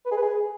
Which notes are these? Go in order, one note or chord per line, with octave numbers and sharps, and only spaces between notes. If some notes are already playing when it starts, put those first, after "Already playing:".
B4
G#4
B4
G#4